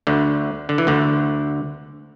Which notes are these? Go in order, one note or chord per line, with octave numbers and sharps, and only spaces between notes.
D2 D3
D3
E3
D2 D3